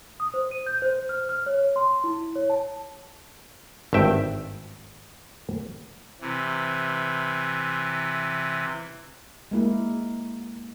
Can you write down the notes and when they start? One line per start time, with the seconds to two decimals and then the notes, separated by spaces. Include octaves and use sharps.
0.20 D#6
0.34 C5
0.51 D#7
0.66 G6
0.82 C5
1.09 F6
1.29 F6
1.46 C#5
1.76 C6
2.04 E4
2.35 C#5
2.50 A5
3.93 G#1 G2 E5 G5
6.21 C3 E3
9.51 G#3 A#3 E4